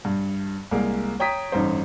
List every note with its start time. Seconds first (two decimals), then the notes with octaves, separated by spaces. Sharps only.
0.05 G2
0.71 C2 G#3 A#3
1.20 C#5 G5 A#5 D#6 B6
1.52 A1 G2 D#4 C5